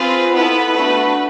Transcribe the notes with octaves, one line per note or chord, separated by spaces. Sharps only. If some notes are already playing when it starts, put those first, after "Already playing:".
Already playing: C4 F4 G#4 B4
B3 E4 A4 B4
A3 D4 F#4